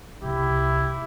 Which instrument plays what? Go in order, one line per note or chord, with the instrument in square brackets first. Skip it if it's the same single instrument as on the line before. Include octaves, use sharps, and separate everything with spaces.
[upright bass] C2 [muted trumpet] E4 [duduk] G4